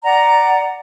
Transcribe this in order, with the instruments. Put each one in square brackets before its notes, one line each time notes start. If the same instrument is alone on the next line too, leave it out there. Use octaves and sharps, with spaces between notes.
[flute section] D5 F#5 A#5